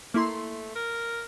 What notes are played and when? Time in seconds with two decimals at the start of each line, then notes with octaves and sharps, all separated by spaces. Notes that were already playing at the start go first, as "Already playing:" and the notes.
0.14 A3 A#3 E4 C6
0.76 A#4